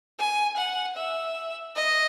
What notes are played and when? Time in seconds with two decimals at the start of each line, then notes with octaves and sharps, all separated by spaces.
0.19 G#5
0.58 F#5
0.97 E5
1.75 D#5